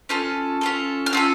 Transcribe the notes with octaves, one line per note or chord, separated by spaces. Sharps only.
C#4 F4 A4 F6
C#4 F4 A4
F6
C#4 F4 A4 E6